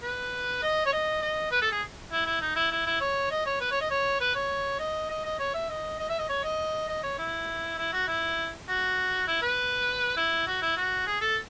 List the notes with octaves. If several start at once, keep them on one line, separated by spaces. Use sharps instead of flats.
B4
D#5
C#5
D#5
D#5
B4
A4
G#4
E4
E4
D#4
E4
E4
E4
C#5
D#5
C#5
B4
C#5
D#5
C#5
B4
C#5
D#5
D#5
D#5
C#5
E5
D#5
D#5
E5
D#5
C#5
D#5
D#5
C#5
E4
E4
F#4
E4
F#4
E4
B4
E4
F#4
E4
F#4
G#4
A4